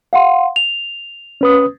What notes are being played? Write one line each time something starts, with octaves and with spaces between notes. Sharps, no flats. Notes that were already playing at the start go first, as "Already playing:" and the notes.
F5 F#5 C6
F7
C#4 B4 D#6